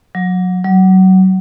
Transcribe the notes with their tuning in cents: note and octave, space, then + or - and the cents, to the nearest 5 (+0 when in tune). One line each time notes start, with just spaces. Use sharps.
F#3 -20
F#3 +25